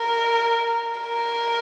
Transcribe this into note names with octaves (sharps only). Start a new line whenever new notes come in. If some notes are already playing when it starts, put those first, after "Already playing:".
Already playing: A#4
A#4